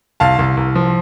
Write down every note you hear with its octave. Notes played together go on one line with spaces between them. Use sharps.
C2 F5 A5
C2
C2
F3